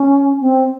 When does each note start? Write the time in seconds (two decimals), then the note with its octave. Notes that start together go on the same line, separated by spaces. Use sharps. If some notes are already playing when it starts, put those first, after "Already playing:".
Already playing: C#4
0.41 C4